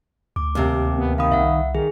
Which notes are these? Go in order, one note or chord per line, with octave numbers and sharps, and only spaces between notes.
D2 D6
D#2 C3
B3
D#3 F5 B5 D#6
C2 E5 F#5
D#3 G#4